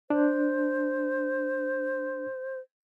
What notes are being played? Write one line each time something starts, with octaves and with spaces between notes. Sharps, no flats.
D4 C5